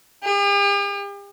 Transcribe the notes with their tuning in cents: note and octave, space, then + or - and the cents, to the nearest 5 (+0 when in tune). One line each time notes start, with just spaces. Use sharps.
G4 +45